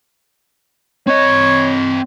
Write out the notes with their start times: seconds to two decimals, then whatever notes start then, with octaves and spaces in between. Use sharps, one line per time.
1.07 C4 C#5 D#5